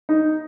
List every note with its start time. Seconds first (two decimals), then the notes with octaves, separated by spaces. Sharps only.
0.09 D#4